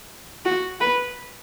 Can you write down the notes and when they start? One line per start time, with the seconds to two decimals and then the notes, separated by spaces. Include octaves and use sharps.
0.45 F#4
0.81 B4